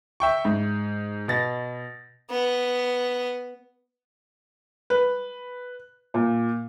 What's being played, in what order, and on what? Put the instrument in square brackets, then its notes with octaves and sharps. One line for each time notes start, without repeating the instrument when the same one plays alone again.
[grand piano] E5 G5 C#6
G#2
B2 A6 A#6
[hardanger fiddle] B3
[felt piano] B4
A#2